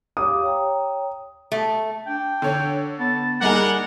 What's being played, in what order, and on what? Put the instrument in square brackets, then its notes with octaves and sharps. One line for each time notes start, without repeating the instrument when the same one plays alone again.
[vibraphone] G4 F5 D6 [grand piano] D#6
[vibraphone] C#5 G5 A#5
[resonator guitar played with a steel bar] A3
[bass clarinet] D4 [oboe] G5
[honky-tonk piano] D3 C#5
[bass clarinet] B3 [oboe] A5
[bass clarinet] G3 [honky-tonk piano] A#3 D#4 G#4 [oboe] D4 [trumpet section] A#4 F#5